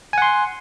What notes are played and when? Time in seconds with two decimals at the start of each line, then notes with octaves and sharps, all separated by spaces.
0.13 G#5
0.18 F#5
0.22 C6